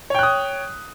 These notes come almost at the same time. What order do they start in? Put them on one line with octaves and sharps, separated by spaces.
C#5 G5 F#6 D#6